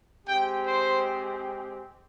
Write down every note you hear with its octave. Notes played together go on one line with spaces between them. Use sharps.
G#3 C4 G4 G5
C5